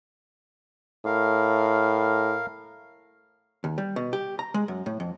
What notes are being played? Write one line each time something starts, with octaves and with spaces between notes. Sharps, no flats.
A2 A#4 F5
D#2
G3
B2
G4
A#5
G#3
F#2
A2
F2